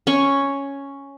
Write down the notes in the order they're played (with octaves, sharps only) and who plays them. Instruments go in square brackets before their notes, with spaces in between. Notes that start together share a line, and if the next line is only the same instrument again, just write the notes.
[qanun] C#4 C#6